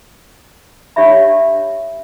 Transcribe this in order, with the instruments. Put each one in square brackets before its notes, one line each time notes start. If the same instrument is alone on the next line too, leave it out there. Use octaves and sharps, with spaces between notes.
[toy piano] D4 G4 C#5 E5 B5